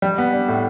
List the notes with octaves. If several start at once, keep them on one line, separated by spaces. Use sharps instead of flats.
G3
B3
D4
A2